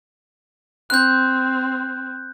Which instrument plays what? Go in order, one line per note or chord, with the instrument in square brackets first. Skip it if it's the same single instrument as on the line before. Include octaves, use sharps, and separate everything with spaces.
[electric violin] C4 [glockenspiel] F#6 G6